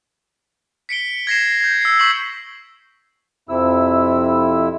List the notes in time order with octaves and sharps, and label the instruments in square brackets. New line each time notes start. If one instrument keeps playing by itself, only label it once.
[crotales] B6 C#7 D7 G7
G#6 A#6 C7 E7
G6 G#6
E6 C7
C#6 G6 B6 C7 F#7
[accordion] F2 C3 E4 E6